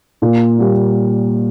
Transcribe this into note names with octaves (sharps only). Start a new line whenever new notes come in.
A#2
G3 A#3